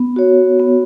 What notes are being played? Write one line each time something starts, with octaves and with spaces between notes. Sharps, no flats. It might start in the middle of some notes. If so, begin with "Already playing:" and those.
Already playing: B3
F#4 C#5
B3